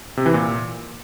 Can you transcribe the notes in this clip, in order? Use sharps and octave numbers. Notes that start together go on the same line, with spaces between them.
C3
E3
A#2